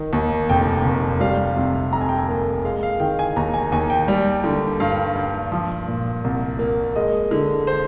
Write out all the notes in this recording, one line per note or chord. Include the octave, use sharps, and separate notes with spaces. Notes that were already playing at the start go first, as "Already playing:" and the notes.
Already playing: D#3
D#2
F1 G5
F1
G3 F5
C3
F2 A#5
G#5
G5
G#5
A#3
G#3 F5
F5
D#3 G5
G#5
D#2 A#5
G#5
D#2 G#5
G5
G3
D3
G2 F5
G2
F3
A#2
C2
A#3
G#3 D#5
D3
C5